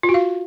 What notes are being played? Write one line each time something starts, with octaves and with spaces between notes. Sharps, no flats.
F4
F#4
F5